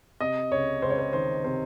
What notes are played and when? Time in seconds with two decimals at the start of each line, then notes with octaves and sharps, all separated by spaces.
0.20 C3 D#5
0.51 C#2 C#5
0.82 C#2 C5
0.90 C#5
0.98 C5
1.13 D#3 C5
1.44 C3 C5